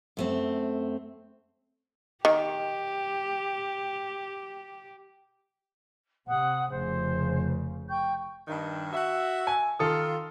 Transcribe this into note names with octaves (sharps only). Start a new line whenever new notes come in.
F#2 A3 C4
D#3 G4
C3 F#5 D#6
F1 C#3 C5
G5 C#6 G6
G2 D#3
F#4 E5
G#5
D#3 F4 A4 D#6